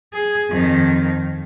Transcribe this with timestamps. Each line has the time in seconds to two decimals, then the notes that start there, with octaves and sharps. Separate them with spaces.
0.13 G#4
0.50 F2 D#3